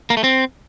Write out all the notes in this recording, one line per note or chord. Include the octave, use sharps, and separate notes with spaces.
A#3
A3
C4